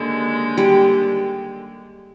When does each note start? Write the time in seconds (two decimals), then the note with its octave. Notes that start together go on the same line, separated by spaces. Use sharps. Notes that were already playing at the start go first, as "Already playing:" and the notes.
Already playing: D#2 D3 G#3
0.57 G3